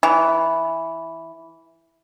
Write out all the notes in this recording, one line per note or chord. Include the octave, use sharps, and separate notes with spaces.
E3